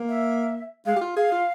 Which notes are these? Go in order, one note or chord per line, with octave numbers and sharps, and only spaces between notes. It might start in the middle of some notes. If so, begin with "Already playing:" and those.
Already playing: A#3
E5
G#3 F5
G4
F4
G#4 F5
F4